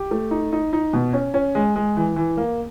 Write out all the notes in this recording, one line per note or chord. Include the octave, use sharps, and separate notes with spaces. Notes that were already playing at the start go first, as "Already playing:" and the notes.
Already playing: G4
A3
D#4
D#4
D#4
B2
C#4
C#4
G#3
G#3
E3
E3
A#3